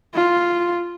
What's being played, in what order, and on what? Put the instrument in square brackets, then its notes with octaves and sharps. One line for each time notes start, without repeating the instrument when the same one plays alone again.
[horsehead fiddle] F4